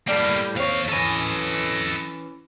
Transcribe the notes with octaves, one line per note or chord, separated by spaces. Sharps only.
A2 G3 A#3 E4 G4
D#2 C4 C#5 F5
E3 C#4 A4 D#5